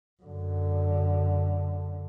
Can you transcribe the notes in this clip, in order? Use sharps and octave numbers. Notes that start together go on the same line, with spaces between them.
F#2 D3